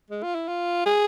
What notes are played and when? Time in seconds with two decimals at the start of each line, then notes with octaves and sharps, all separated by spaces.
0.11 G#3
0.23 F4
0.35 E4
0.48 F4
0.86 G#4